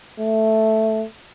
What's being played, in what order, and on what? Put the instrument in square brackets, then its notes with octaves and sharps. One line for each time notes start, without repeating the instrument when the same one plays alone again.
[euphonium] A3